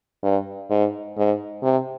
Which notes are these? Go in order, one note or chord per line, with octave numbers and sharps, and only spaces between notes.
G2
G#2
G#2
C3